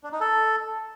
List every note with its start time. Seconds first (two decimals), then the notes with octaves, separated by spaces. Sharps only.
0.04 D4
0.12 D#4
0.21 A4